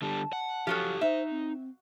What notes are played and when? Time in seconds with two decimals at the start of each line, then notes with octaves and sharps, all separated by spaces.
0.02 D3 G3 A5
0.33 F#5
0.67 F3 F#3 F4 G4 A4
1.01 D#4 C5 E5
1.30 C4